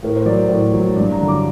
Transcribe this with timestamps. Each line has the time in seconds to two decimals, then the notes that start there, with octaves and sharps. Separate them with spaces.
0.03 A2 A#4
0.16 C5
0.26 F#3 D5
0.49 A2 C5
0.73 F#3
0.96 G2 D5
1.12 A#5
1.20 D3 F#3
1.28 D6